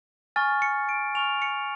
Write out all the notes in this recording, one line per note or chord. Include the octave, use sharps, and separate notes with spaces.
G#5 C#6 F6 A6
C#7
D7
G#5 C#6 F6 F7
C#7